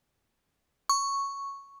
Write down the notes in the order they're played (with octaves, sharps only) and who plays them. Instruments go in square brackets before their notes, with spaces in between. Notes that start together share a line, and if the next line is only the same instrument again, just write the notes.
[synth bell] C#6